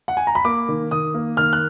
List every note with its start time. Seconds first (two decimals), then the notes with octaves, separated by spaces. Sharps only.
0.08 F#5
0.17 G#5
0.27 A#5
0.35 B5
0.45 A#3 D6
0.69 D#3
0.91 D#3 D#6
1.14 A#3
1.37 D#3 F6
1.53 F#6